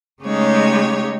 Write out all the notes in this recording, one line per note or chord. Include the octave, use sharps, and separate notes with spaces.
C#3 G#3 A3 D#4 G4 C#5